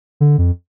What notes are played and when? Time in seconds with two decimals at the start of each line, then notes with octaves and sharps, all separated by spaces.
0.20 D3
0.38 F2